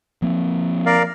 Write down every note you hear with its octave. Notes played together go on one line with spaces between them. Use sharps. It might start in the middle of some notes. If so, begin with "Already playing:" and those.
F3 A#3 C4
A#4 D5 F5